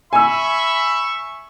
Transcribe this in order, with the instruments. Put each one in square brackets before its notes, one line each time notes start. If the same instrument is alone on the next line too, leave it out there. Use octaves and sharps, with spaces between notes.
[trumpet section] E5 C#6 [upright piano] G#5 E6 [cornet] B5